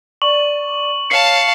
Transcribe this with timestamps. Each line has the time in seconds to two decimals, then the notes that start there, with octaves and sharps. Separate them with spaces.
0.22 D5 C#6 F#7
1.10 C#5 F5 A5 C7 C#7